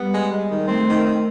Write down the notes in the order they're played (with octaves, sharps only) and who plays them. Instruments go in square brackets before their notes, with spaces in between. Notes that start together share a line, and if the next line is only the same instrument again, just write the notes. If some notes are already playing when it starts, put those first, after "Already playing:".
Already playing: [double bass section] G3 [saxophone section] B3
[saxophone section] G#3
G#3
D#3
[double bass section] A3 [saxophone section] C4
[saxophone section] D#3
D#3